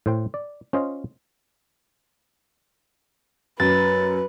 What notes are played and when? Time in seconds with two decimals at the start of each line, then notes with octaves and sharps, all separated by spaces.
0.06 A2 C5 G5
0.34 D5
0.73 C#4 F4 C5 D#5
3.60 F#2 B4 A6